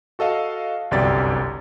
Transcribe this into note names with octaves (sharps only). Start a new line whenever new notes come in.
F#4 A4 D#5 F5
G1 C2 F#2 G4 D5 A6